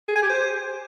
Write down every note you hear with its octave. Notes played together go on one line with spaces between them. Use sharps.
G#4
G#5
G4
C5